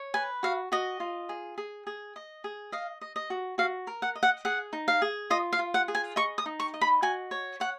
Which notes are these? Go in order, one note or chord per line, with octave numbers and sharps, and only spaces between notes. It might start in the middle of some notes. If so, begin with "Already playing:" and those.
Already playing: C#5
B4 G#5
F#4 F5
F#4 D#5
F4
G#4
G#4
G#4
D#5
G#4
D#5 F5
D#5
D#5
F#4
F#4 F5
A#4
F#5
D#5
F#5
G#4 F#5
D#4
F5
G#4
F4 D#5
F5
F4
F#5
G#4
G#5
D#5 C#6
D#6
D#4
C#6
D#5
B5
F#4 G#5
C#5
C#5 F#5